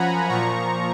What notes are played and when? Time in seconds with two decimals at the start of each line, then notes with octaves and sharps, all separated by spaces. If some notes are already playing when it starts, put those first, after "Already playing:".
Already playing: F#2 F3 F#5 G#5 A#5 B5
0.29 A#2 F3 A#5 C#6